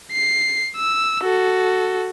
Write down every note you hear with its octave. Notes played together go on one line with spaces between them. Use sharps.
C7
E6
F#4 A4